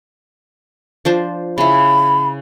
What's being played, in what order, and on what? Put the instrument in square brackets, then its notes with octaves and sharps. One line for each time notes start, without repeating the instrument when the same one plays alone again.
[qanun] F3 D4 C5
[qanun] C#3 E4 [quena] B5